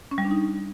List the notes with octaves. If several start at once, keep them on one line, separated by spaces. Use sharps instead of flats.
C#4
G3
D4
D#4